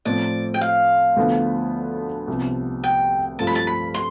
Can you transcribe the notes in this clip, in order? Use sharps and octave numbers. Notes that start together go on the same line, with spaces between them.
A2 F3 C4 D5
G5
F5
D2 D3 F3 B3
C2 C3 F3 B3
G5
G2 F3 A3 C4 F4 A5
B5
A5
B5
C6